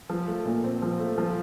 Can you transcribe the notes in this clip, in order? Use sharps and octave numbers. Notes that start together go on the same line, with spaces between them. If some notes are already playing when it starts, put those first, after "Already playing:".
F3
A3
A#2
C4
F3
A3
F3